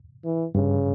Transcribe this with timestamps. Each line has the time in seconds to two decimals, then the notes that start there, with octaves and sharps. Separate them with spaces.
0.24 E3
0.55 G2 C#3